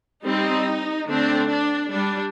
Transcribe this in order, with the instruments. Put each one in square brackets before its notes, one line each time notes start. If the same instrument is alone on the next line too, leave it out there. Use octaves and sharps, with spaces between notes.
[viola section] G3 C4 D#4
D3 A3 C4 D4
D4
G3 D4